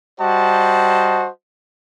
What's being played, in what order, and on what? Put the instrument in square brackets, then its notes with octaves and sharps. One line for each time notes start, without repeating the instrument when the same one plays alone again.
[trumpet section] G3 F#4 C5 D#5 A5